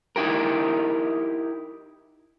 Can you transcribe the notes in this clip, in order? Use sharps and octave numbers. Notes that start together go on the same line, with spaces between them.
D#4 E4 G4 A#4